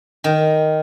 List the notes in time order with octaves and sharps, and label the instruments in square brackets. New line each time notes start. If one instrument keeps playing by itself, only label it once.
[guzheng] D#3